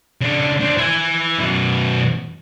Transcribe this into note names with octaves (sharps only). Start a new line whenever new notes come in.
C#3 D4
D4 C5
E4 G#5
F#2 B2